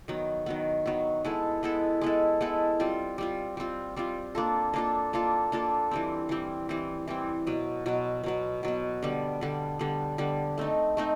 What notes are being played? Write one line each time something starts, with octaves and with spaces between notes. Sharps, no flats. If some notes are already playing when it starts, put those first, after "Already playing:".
D#3 F#3 B3
D#3 F#3 B3
D#3 F#3 B3
G#3 B3 E4 A4
G#3 B3 E4 A4
G#3 B3 E4 A4
G#3 B3 E4 A4
G3 C4 F4
G3 C4 F4
G3 C4 F4
G3 C4 F4
A#3 D4 F4 A4
A#3 D4 F4 A4
A#3 D4 F4 A4
A#3 D4 F4 A4
E3 G3 C4
E3 G3 C4
E3 G3 C4
E3 G3 C4
B2 F#3 B3
B2 F#3 B3
B2 F#3 B3
B2 F#3 B3
D3 G3 B3
D3 G3 B3
D3 G3 B3
D3 G3 B3
A3 C4 D#4
A3 C4 D#4